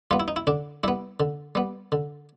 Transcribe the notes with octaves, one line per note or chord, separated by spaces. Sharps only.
G3 B3 F4
E4
D#4
E4
D3 D4
G3 B3 E4
D3
G3 B3
D3